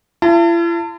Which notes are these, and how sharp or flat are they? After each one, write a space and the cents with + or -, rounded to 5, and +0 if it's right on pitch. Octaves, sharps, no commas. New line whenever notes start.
E4 +45 A5 +35